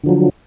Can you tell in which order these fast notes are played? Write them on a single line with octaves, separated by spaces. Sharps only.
D3 F3 F#3